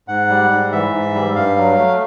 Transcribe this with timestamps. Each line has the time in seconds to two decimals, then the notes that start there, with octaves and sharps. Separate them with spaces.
0.08 G#2 F#5
0.30 G3
0.51 G#2
0.72 E3 E5
0.93 G#2
1.15 G3
1.35 G2 F5
1.57 F#3
1.78 A3